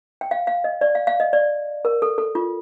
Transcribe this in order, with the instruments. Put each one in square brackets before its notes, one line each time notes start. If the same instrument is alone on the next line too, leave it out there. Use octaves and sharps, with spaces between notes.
[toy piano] G5
F5
F5
D#5
D5
F5
F5
D#5
D5
A#4
A4
A4
F4